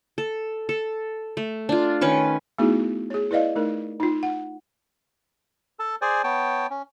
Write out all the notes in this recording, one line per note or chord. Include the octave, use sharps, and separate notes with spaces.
A4
A4
A3
D4 F4
D#3 C#4 B4 C#6
A3 B3 D#4 E4 F#4 G#4
G#4 C#5
E4 B4 D5 D#5 F5
A3 D#4 A#4
D#4 F4
F#5
A4 A5
G#4 C5 D5 G#5
B3 C#5 G5 A5
C#4